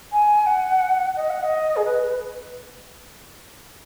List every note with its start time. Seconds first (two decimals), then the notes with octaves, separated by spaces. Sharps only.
0.12 G#5
0.46 F#5
1.16 D#5
1.30 F#5
1.43 D#5
1.76 G#4
1.84 B4